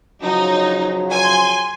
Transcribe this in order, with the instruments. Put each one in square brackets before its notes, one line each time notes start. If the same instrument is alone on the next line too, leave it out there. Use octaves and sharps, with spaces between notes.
[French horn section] C#3 F3 F#3 [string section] D#4
[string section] G#5 C6